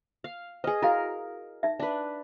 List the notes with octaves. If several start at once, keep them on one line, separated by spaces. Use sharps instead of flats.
F5
G#4 B4 D#5
E4 F#4 A#4 F5
D#4 E5
D4 B4